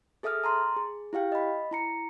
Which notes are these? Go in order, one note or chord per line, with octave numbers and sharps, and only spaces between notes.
G#4 A4 E5 D#6 F6
A5 A#5 C6
G#4
E4 G4 F5 G5
D#5 B5
E4 A#5 C#7